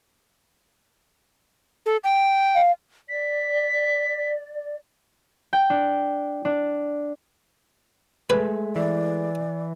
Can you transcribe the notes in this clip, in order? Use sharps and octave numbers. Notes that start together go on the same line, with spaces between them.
A4
G5
F5
D5 B6
G5
D4
D4
G#3 A3 B4
E3 D5